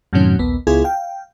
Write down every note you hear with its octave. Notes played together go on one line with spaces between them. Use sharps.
F#2 A2 C3 D#3 F#3 C#4
A#1 D#2 B3
C#2 B3 E4 F4 G#4 G#6
F5 G5